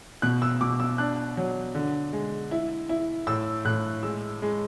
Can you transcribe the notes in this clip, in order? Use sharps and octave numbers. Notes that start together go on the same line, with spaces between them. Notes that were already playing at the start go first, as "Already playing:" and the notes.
B2 F#6
E6
B2 D6
E6
D4 F#6
F#3
D3
G#3
E4
E4
A2 E6
A2 F#6
G#3 E6
G#3